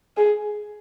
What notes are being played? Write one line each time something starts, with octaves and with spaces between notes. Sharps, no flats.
G#4